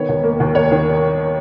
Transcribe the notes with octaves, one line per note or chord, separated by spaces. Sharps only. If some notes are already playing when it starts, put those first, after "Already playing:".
Already playing: D#3 B3 C#5
D#2
A#3
D#2
A#3 C#5
D#3